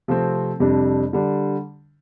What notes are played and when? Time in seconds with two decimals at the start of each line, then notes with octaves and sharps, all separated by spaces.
0.08 C3 F3 A3 C4
0.60 F2 C3 G3 D4
1.13 D3 G3 D4